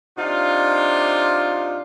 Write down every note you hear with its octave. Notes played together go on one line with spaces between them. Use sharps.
C3 D4 D#4 F4